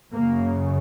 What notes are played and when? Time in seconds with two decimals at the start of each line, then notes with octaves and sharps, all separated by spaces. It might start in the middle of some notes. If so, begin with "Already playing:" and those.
0.11 F#2 C#3 A#3